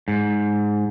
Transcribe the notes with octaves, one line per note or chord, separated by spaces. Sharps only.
G#2